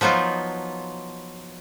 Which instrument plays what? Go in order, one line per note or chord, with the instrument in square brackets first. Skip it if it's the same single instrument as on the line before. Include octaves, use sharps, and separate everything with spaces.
[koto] F3 F#3 B3 D#4 F4